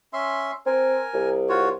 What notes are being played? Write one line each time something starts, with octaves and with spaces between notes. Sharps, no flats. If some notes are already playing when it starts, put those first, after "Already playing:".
C#4 E5 C6
C4 A#4 G#5
C2
F4 F#4 C#5